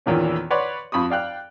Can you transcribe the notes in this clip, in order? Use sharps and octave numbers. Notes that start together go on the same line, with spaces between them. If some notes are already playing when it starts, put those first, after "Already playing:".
E2 A#2 D#3 E3 C#4
B4 C#5 D5 F#5 C6
F2 B5 C#6 D#6
D5 F5 G5 F#6